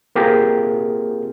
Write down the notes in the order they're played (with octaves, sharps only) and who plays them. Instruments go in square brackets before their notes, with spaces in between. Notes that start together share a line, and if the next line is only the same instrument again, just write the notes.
[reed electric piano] A#3 C4 F4 G4 G#4 A#4